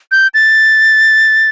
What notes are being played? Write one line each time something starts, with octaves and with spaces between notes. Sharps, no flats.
G6
A6